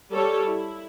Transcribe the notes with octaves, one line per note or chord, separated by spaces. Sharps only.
G3 G4 A4 C#5
E4